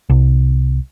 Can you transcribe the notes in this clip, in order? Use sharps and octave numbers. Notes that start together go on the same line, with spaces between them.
C2